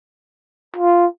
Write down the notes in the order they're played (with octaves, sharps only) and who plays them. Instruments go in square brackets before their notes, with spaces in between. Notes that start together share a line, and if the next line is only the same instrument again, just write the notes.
[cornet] F4